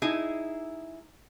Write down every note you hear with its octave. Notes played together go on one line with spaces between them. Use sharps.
D#4 E4 G#4